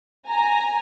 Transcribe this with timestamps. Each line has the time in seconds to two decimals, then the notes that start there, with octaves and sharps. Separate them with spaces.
0.28 G#5 A#5